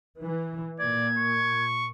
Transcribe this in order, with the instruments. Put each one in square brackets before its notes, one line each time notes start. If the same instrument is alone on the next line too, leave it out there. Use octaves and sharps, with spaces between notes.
[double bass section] E3
[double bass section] A#2 [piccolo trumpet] D5 [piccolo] G#6
[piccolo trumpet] C#6